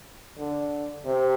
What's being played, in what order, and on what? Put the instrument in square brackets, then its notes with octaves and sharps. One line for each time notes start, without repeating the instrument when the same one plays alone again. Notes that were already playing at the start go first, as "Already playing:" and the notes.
[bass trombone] D3
C3